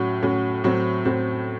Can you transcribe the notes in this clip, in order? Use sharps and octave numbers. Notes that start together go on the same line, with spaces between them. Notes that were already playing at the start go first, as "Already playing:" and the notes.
Already playing: A2 F#3 C#4 F#4
A2 F#3 C#4 F#4
A2 F#3 C4
A2 F#3 C4